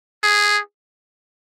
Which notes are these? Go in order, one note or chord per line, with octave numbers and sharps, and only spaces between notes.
G#4